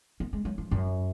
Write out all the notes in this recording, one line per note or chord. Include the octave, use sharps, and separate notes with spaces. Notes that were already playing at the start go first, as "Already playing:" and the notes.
B3
G#3
F#3
F3
F#2